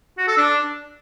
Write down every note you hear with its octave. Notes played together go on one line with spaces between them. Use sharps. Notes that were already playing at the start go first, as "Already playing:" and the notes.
F#4
A4
D4